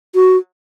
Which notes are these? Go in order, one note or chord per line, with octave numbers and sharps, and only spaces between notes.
F#4